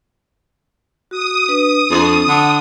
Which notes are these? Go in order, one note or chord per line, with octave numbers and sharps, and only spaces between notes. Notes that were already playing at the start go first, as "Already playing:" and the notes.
F#4 D#6
D4 B4
F2 D4 A4
D3 F#5